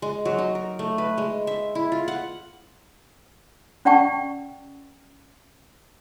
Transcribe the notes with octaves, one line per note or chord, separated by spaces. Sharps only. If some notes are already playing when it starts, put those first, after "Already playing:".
G#3
F#3
D#4
A#4
A3
B4
G#3
E5
E4
F4
F#5
C#4 D5 F#5 G5 A5 C#6